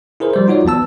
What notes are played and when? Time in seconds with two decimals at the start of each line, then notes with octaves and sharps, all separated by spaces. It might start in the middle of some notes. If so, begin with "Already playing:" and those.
0.20 E4 G#4 A#4 C5
0.34 F3 G3 C5
0.48 D#4 F4 F#4 C#5 D5
0.65 E2 F#3 B3 A5 E6